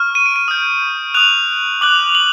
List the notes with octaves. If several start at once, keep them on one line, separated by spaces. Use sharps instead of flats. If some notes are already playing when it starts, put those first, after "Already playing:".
Already playing: C#6 F6
D#7
D7
D#7
D#6 G6
D#6 F#6 F7
D6 F#6 F#7
F#7